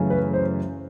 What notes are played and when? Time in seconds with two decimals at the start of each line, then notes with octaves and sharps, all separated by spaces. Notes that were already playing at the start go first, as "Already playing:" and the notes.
Already playing: F#2 C#3 E3 A3 C#4
0.10 B4
0.34 C5